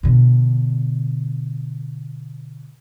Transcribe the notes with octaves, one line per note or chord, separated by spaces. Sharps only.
B2 D3